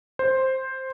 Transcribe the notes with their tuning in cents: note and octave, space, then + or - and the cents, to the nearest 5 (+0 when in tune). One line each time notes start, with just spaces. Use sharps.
C5 +5